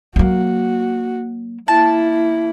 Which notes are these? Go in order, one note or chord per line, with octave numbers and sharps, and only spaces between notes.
F#3 A#3 F#4
A#3 E4 A5